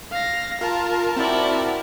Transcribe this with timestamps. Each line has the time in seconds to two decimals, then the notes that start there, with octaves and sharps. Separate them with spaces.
0.11 F5 A#6
0.61 F4 A#4 A5
1.16 C4 E4 F#4 D5